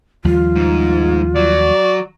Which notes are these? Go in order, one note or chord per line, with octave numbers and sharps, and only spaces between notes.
D#2 F3 G3 F4
G#2
F#3 D5